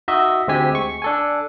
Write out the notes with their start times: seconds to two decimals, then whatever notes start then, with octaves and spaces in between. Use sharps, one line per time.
0.08 D#4 F#4 D#5 E5
0.48 D2 G#3 C4 G4 G#5 B6
0.75 C#6
1.02 D4 A4 G#5